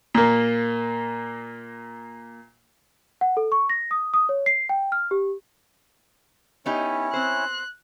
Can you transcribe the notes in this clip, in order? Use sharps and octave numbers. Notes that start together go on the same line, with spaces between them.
A#2 A#3
F#5
A4
C#6
A#6
D#6
D#6
C#5
C7
G5
F6
G4
B3 C#4 D#4 E4 G4 C#5
C4 C5 F#6